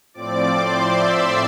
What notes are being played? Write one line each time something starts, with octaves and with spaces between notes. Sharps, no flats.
A2 F3 C4 D5 D6
C5 C6
E5 E6